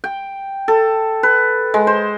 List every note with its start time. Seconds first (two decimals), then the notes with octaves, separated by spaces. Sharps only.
0.04 G5
0.68 A4
1.23 B4
1.74 G#3
1.87 C5